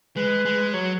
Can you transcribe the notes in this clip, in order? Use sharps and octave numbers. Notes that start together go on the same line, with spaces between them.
G#3 B4
G#3
F#3 C#5